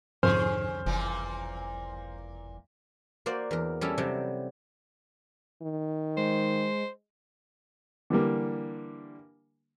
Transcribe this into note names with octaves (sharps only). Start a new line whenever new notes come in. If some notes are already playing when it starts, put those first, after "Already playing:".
C2 F2 G#2 D3 C#4 G#4 C5 F6
F#1 A#2 E3 A#3
A#3 F#4 C5 D5
E2 A#4
G3 C#4 E4 A4
C3 F#3 G3
D#3
G#3 C5
D3 E3 G3 A#3